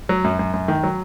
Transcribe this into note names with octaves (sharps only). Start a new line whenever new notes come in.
F#3
F#2
F#2
F#2
D#3
F#3